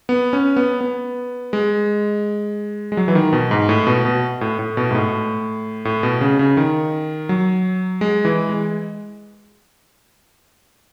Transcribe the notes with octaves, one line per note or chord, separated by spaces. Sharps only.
B3
C#4
B3
B3
G#3
G#3
F#3
E3
D#3
B2
G#2
A2
B2
B2
A2
A2
B2
G#2
A2
A2
B2
C#3
C#3
D#3
F#3
G#3
E3
G#3